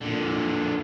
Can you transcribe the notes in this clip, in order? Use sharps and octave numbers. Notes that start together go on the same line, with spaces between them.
A#2 D3